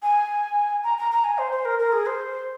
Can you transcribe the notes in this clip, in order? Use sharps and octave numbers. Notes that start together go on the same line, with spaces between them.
G#5
A#5
A#5
A#5
G#5
C5
C5
A#4
A#4
G#4
C5